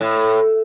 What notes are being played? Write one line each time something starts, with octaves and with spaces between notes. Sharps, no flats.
A2